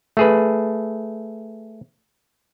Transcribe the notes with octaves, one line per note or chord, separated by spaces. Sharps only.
A3 G#4 B4